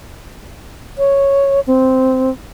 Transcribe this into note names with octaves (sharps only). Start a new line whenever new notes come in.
C#5
C4